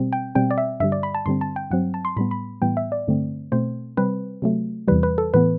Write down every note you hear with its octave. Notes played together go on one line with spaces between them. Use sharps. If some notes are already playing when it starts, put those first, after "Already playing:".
Already playing: B2 G3 C4
G5
B2 G3 C4 G5
D5
E5
G2 D3 G3 E5
D5
B5
A5
G2 D3 G3 C4 C6
A5
G5
G2 F#3 C4 F#5
A5
C6
A2 G3 B3 B5
B5
A2 E3 G3 B3 G5
E5
D5
G2 D3 A3 C4
B2 A3 C4 C5
C3 G3 C4 B4
C3 F#3 A3
E2 C3 E3 G3 B4
B4
A4
A2 E3 B3 B4